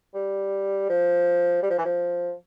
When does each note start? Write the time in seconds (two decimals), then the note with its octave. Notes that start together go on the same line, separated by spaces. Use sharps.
0.14 G3
0.89 F3
1.63 G3
1.70 F3
1.78 E3
1.85 F3